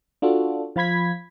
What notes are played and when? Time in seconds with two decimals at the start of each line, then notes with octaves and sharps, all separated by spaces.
0.22 D4 F4 F#4 A4
0.76 F3 F4 B5 G#6 B6